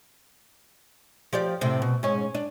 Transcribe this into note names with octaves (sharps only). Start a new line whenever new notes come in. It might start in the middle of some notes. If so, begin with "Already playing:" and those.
F3 G4 D5
A2 C3 C4
B2
G#2 C#4
D4